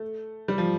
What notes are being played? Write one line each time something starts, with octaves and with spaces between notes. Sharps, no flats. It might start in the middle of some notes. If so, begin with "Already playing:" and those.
Already playing: A3
G3
F3